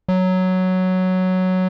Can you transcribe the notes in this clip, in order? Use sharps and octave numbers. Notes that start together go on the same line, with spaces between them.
F#3